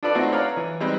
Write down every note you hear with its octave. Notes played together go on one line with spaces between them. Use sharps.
D4 F4 A4 B4 D5
A3 C4 D#4 F#4 D#5
B4 C#5 D5 F5 A#5
E3
G3 G#3 C4 D#4 B4 C5